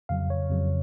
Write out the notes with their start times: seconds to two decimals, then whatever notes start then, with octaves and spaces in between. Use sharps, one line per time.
0.09 F2 C#3 F#3 F5
0.30 C#5
0.50 F2 C#3 F#3